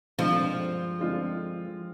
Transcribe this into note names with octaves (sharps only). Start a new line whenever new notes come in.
G2 D3 F3 G#3 C4 F4
D3 G#3 C4 F4